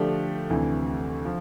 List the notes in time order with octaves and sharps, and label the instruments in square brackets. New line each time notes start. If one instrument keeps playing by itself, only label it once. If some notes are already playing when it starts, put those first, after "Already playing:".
Already playing: [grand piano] D3 F3 A3 D4 G4
D2 C3 E3
F3